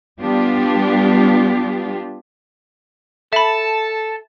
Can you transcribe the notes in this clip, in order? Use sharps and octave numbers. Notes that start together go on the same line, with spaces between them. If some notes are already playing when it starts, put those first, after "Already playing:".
G3 B3 D4 F4 G4
A4 E5 A5 B5